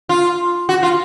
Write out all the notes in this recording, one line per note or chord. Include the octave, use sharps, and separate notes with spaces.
F4
F#4
F4